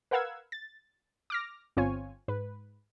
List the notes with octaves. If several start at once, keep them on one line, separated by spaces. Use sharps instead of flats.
A#4 B4 F5 F#5 E6 G#6
A6
D6 F6 A#6
G1 C4 F4 C#5 G#5
G#2 B4